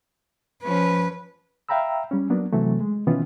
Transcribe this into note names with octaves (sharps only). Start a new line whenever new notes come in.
F3 C#4 B4
E5 F5 G5 A#5 B5 E6
G3 C#4
F#3 A#3 B3 D4
C3 E3 F#3 A3
G#3
B2 D#3 E3 B3 C#4 F4